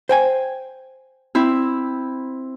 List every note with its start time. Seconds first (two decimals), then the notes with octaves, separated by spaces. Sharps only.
0.09 C5 G5 G#5
1.35 C4 E4